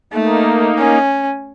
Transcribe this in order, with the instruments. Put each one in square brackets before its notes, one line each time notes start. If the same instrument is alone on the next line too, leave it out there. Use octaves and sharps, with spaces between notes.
[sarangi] A3 [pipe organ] A#3 D#4
[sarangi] C#4